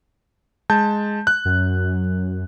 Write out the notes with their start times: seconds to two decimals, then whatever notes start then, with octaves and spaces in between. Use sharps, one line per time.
0.70 G#3 A5 G6
1.27 F#6
1.45 F#2